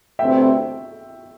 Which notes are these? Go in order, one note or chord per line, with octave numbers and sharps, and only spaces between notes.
D2 C3 E3 A3 C4 E5 G5
E5 G5